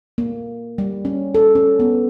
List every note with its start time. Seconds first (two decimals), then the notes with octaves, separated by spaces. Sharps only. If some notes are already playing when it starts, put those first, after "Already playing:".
0.18 A#3
0.78 G3
1.05 C#4
1.34 A4
1.55 C#4
1.80 B3